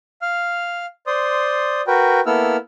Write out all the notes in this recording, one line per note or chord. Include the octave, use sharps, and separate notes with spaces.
F5 F6
C5 D5 C6 D#6
F#4 A#4 B4 G5
A#3 B3 E4 A4 E6 F6